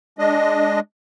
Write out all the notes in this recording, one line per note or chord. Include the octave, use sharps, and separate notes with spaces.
G#3 D4 D#5